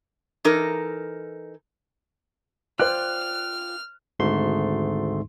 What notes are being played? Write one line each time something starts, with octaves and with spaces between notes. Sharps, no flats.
E3 D#4 A4 A#4
F4 C5 D5 G5 F6 F#6
G#1 D2 G#2 A3 C6